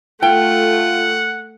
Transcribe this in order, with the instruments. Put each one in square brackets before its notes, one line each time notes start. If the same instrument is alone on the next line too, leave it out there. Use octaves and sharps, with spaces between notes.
[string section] A3 [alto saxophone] F4 [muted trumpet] F#5 [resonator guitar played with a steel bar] G5